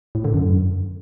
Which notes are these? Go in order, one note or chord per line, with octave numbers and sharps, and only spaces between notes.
A2
D3
F#2